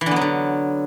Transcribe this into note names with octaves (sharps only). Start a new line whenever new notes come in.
E3
D3
B3
F#3
D3